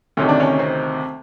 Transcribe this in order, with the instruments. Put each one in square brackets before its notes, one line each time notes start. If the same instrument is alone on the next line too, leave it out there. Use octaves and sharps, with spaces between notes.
[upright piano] D2 C3 D#3 C#4
D4
C#4
C4